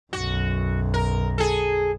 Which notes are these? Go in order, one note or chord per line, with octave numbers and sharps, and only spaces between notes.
B1 F#2 F#4
A#4
G#4 A4